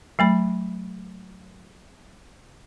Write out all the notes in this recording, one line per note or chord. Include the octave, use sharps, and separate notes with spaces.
F#3 A3 B5